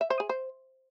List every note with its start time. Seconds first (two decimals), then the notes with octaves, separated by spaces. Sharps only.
0.01 E5
0.10 C5
0.20 G#4
0.29 C5